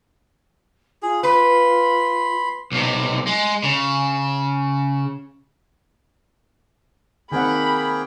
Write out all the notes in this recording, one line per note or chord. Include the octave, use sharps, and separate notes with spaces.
F4 G#4
B4 B5 C6
B1 C3
G#3
C#3
D#3 A#3 C4 G#4 F#5 G5 B5